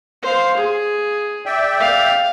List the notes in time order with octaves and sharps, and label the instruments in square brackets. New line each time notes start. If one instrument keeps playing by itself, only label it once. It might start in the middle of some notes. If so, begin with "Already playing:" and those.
[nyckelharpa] C5 F5
G#4
[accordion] D5 E5 G5
[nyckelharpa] F5